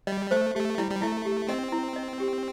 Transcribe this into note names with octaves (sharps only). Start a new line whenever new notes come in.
G3 D#5
A3 C5
A3 G4
G3 E4
G3
A3 E4
G4
C4 D#5
E4
D#5
G4